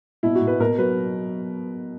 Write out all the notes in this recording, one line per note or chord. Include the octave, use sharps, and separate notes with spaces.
B2 E4
F#4
B2
B4
B2 A#4
F#3 B4